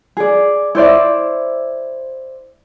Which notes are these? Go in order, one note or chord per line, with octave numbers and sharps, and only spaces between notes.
G#4 D5
E4 C5 D5 E5